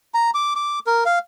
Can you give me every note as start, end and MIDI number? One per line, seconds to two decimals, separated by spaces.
0.14 0.30 82
0.34 0.53 86
0.56 0.79 86
0.87 1.04 70
1.06 1.19 77